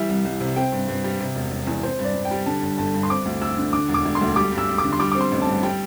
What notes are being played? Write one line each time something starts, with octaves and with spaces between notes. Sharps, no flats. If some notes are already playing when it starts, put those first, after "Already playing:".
Already playing: E3 G3 E5
C2
C2
C3
C4 G5
G2
G2
G3
C3
E1
E1
E2
C4 C5
G2
D5
G2
G5
G3
D3 A5
G1
G1 A5
G2
C6
C4 D6
D2
D2 E6
D3
D3 D6
E1
D6
E1
C6
D2
G3 D6
G2
E6
G2
D6
D3
C6
G3 D6
C4 D6
C6
A1
A5
G2
G3 G5